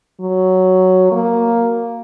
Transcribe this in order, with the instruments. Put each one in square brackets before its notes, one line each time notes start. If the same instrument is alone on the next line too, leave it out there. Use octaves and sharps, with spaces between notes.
[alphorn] F#3
A#3